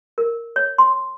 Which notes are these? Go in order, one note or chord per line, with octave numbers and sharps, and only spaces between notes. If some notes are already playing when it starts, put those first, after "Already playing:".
A#4
C#5
C6